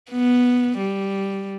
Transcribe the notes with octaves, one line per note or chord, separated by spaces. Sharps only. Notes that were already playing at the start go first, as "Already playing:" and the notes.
B3
G3